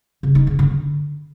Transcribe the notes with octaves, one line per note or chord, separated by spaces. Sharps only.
C#3
D#4
C#3
D3